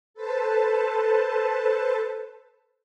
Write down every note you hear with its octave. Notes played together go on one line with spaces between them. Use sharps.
A4 B4 C5 A5